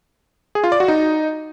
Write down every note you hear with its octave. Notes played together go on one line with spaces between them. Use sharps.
G#4
F4
D5
F#4
D#4